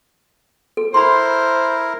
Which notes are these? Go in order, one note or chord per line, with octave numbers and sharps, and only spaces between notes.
A4
E4 A#4 C5 B5 C6